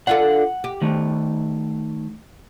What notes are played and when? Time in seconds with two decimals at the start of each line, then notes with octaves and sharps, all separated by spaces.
0.07 D4 F4 A4 F#5
0.64 G4
0.82 D#3 A3